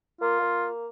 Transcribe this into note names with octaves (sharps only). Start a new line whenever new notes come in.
A#3 F4
A#3